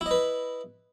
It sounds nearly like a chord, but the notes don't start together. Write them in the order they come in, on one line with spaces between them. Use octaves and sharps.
E4 D#5 B4